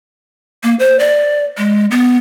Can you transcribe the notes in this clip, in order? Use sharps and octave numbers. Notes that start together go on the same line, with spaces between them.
A#3
C5
D5
G#3
B3